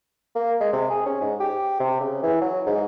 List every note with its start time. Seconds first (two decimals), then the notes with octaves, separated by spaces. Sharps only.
0.35 A#3
0.61 G#3
0.73 C3
0.90 G#4
1.06 C#4
1.21 G#2
1.40 G4
1.80 C3
2.00 C#3
2.23 E3
2.41 F#3
2.67 G#2